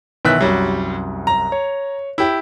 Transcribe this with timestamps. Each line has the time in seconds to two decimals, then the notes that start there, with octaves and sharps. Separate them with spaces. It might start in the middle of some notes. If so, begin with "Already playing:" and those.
0.25 B1 D#3 E3 B3 E5 F#6
0.40 C2 F#2 F#3 G3
1.27 A#5
1.52 C#5
2.18 E4 G4